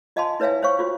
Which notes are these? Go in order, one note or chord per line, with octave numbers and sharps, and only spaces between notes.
F4 D#5 F5 G#5 A5 C6
E4 B4 C#5 E5 F5 G#5
C5 C#5 F5 G5 C#6
F4 F#4 C5